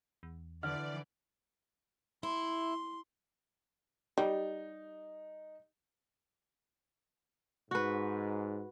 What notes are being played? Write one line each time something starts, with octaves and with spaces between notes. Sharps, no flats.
E2
D3 E3 D5 F6
E4 C6
G3 D#4
G#2 F#4 B4